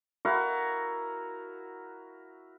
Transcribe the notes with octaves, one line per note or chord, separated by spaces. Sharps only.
E4 F#4 A#4 F5